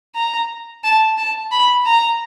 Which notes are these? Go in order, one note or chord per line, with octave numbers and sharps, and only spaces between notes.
A#5
A5
A5
B5
A#5